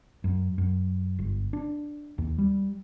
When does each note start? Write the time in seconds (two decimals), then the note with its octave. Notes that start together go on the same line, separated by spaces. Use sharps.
0.24 F#2
0.58 F#2
1.19 G1
1.53 D4
2.18 D#2
2.38 G3